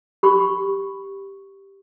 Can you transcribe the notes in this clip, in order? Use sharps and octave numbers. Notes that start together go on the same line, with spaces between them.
G4 B5 C#6